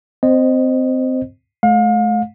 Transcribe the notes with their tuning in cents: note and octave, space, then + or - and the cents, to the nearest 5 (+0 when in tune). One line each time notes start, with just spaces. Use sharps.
C4 -20 C5 +5 D#5 -10
A3 -40 F5 +35